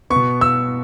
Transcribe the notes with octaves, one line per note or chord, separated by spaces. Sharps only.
B3 C#6
B2
E6